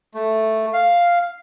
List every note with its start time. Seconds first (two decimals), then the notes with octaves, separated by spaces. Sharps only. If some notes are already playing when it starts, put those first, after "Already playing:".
0.14 A3
0.73 F5